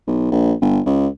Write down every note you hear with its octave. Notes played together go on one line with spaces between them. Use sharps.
B1
A#1
G1
C#2